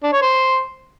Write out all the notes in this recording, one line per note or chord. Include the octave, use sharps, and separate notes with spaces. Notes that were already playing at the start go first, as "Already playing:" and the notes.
D4
C#5
C5